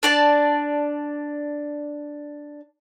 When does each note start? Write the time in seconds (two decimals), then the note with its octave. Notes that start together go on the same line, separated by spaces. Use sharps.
0.03 D4 D5 A5